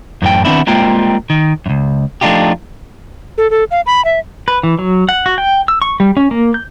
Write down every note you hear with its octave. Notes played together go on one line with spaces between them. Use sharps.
F#2 A2 E3 G5
D#3 B3 C4 D4 E4
G3 G#3 A#3 C4 F4 G5
D#3
C#2 F#2
F3 A3 D4 D#4 F4 G4
A4
A4
F5
B5
E5
B4
E3
F#3
F#5
F#4
G5
E6
C#6
G3
C#4
A#3
G6